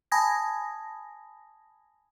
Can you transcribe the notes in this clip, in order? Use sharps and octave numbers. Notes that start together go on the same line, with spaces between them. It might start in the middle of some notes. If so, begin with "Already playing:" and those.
G#5 A5 B5 D#6 G#6 A#6